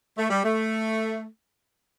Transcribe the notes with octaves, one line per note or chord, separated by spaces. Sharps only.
A3
G3
A3